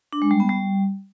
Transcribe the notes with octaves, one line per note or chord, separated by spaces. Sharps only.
D4
G#3
G3
B3
G3